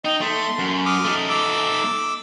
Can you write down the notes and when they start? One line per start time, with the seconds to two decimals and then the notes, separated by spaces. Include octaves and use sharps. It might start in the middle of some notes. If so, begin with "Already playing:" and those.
0.05 D#4 D#5 G5
0.21 A3 C6
0.59 F#2
0.86 D6 D#6 F6
1.05 A3 D#4
1.29 D6 E6